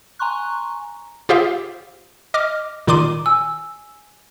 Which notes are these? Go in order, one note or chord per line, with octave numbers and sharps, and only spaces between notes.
G#5 A#5 C6 C#6 F#6
F4 G4 G#4 C5 E5 F5
D#5 D6 F6
A#2 D#3 D5 C6 D6 D#7
G#5 E6